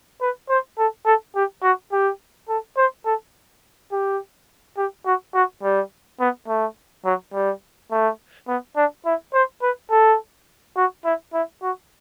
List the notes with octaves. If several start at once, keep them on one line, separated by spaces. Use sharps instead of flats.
B4
C5
A4
A4
G4
F#4
G4
A4
C5
A4
G4
G4
F#4
F#4
G3
B3
A3
F#3
G3
A3
B3
D4
E4
C5
B4
A4
F#4
E4
E4
F#4